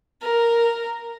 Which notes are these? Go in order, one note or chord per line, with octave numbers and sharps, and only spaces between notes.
A#4